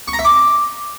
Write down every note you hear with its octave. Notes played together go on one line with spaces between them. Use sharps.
C#6
A#5
E5
D6